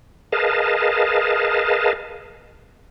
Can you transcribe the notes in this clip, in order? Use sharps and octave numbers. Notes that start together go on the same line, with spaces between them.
G#4 A#4 B4 D#5 F5 A5